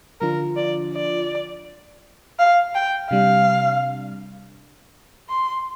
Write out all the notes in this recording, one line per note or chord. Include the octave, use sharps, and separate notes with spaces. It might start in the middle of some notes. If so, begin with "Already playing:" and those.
D3 F3 D4 F4 A#4
D5
D5
F5
G5
C3 G3 D4 F5
C6